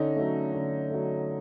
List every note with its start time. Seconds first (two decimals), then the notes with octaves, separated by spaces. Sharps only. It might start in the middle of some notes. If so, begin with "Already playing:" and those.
Already playing: D3 C#4 D#4
0.16 F#3 A3
0.54 D3
0.90 F#3 A3